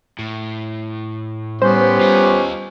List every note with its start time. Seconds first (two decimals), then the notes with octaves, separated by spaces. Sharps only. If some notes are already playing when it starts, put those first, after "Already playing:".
0.19 A2
1.62 G3 B3 C#4 G4 C5
2.01 F4 D#5